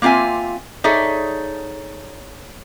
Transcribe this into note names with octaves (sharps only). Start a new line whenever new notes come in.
A#3 C4 F4 E5 G#5
D#4 G#4 A4 C#5 D5 E5